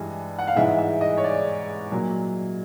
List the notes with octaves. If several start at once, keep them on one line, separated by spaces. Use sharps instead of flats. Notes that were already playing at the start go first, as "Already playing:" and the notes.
Already playing: G2 E3 G#3
F#5
F5
G#2 E3 G#3 E5
E5
D#5
C#5
D5
A#2 F#3